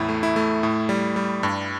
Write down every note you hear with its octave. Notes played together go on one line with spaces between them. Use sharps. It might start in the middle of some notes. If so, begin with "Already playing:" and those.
Already playing: E2 A2 E4
A3
E4
A3
A2
G3
G3
G2